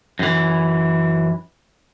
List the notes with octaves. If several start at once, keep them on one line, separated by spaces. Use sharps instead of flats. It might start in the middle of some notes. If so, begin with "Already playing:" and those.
F#2 E3